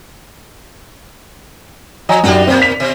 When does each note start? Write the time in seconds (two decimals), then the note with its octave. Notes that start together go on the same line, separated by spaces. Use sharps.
2.09 F3 D#5 G#5 A#5
2.23 F#2 G3 D4 D#4 G4
2.47 B2 A#3 C4
2.62 B6 F7
2.80 B2